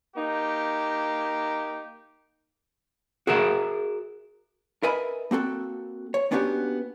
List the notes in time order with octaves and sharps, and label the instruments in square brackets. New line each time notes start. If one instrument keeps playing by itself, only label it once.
[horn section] A#3 D#4 G4
[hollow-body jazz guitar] F#4 G#4 A#4 E5 F#5
A#4 B4 D#5 E5 G#5 B5
A#3 C4 F#4 A4
C#5
A#3 B3 C#4 D4 F#4 G4